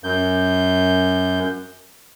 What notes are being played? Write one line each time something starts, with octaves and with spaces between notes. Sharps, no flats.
F#2 G6